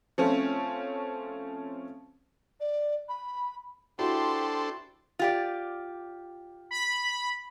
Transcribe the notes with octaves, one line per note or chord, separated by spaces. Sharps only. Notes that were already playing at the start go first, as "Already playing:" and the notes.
F3 A3 C4 C#4
D5
B5
D4 E4 F#4 G4 A4 C5 C6
F4 G4 D5
B5